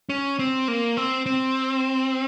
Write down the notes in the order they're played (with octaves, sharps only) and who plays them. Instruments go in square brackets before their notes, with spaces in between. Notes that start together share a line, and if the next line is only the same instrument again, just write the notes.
[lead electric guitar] C#4
C4
A#3
C4
C4